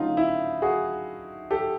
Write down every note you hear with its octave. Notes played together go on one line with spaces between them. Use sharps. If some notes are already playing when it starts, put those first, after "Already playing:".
Already playing: D3 F#3 A3 C#4 D#4 F4
E4
F#4 G#4
G4 A4